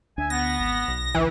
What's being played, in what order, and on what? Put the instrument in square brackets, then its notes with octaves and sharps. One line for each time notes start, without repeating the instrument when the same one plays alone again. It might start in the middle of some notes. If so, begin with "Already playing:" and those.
[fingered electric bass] D2 D4 [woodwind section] E5 G#5
[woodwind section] B3 [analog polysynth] A#6
[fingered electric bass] G#1
B1
[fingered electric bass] A1 D2 [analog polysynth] E3